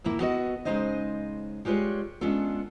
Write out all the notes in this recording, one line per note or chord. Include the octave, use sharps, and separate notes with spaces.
D2 A2 A#3 E4
B3 F#4 A4 B4 D#5
C#3 E3 G#3 D#4 C5 D#5
G3 G#3 F4 B4 C#5
G#3 B3 C#4 D4 F4 A4